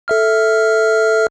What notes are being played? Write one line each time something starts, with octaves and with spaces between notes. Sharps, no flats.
A4 E5 F6